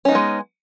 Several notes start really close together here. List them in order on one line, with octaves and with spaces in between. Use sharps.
C#4 D#4 B3 G#3